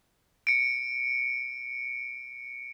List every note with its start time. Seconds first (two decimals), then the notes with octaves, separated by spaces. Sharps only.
0.47 C#7 D7